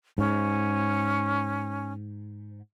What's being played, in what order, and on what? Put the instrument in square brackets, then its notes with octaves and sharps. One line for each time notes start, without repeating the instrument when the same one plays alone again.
[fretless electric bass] G#2 [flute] C#4